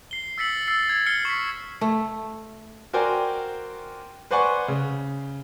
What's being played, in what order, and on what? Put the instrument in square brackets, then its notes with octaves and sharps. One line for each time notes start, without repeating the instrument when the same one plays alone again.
[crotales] C7 G7
E6 A6 B6 C#7 F#7
E6 A6 C7
G#6
F6 C7 C#7 G7
C#6 B6
[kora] A3
[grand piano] F#4 A#4 C5 D5 G5 G#5
B4 C5 D5 F#5 G#5 C#6
C#3